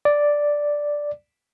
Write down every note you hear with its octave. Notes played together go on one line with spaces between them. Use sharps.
D5